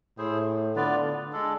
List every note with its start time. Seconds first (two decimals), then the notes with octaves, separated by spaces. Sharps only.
0.18 A2 E4 G#4 C5
0.75 D3 B3 F4 B4 D5
1.33 G#3 D4 A4